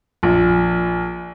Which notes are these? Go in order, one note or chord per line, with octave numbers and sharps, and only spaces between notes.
A#1